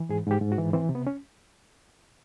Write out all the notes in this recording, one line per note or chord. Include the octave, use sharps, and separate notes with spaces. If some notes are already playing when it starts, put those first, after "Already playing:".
Already playing: E3
G#2 G#4
G#2 G4
G#2
F#4
E3
E3 C4
C3
B3
C#4